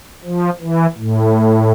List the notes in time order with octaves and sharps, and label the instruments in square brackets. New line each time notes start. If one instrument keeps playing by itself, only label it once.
[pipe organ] F3
E3
A2